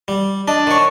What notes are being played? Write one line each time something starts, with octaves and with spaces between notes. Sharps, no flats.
G3
D4 D#5
D#3 C#5